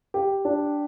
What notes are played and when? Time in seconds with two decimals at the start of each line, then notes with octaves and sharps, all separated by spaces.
0.14 G4
0.45 D4